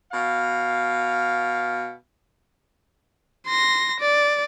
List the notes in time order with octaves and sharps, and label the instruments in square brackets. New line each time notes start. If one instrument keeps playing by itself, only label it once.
[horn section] B2 F5
[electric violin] C6 A#6
D5